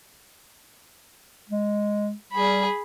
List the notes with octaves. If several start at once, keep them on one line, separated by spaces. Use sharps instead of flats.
G#3
G3 G#4 B5